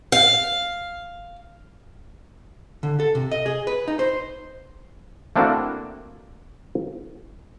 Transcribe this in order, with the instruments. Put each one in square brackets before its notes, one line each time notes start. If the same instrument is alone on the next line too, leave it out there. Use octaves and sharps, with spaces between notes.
[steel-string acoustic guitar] F5
[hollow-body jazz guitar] D3
A4
C3
D#5
G#4
B4
D#4
C5
[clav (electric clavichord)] A3 A#3 C4 D4 E4 F#4